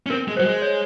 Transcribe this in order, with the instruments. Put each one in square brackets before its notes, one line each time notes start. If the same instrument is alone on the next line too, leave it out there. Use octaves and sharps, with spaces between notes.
[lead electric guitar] C#4
[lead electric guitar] C4 [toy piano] A#4
[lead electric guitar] G#3
[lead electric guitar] F#3 [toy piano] C5
[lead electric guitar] G#3
[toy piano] C#5